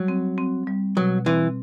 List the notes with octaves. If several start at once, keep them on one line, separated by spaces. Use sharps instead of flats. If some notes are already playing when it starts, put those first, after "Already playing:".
Already playing: F#3 G3
C4
C4
G3
B2 F#3
E3 C4